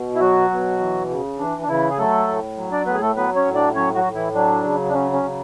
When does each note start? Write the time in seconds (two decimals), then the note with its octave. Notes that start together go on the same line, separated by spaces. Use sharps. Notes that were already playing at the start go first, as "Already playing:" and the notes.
Already playing: B2
0.15 E4
0.20 F#3 F#4
0.50 B2
0.80 E3
1.09 C#3
1.39 E3 D4
1.61 D4
1.68 C#3 E3 E4
1.90 G#4
1.98 F#3 A3 A4
2.28 A2
2.57 F#3
2.72 D4 D5
2.86 A2 B3 B4
2.94 G#4
3.01 A3 A4
3.16 F#3 B3 B4
3.36 C#4 C#5
3.45 A2
3.55 D4 D5
3.75 F#3 C#4 C#5
3.95 F#3 F#4
4.05 A2
4.15 E3 E4
4.34 F#3 D4
4.63 C#3
4.89 D4
4.93 F#3 C#4
5.13 C#4
5.23 C#3